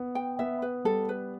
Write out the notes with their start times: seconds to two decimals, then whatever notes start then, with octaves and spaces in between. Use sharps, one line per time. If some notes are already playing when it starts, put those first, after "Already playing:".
Already playing: B3
0.15 G5
0.39 B3 E5
0.62 B4
0.85 G3 A4
1.09 B4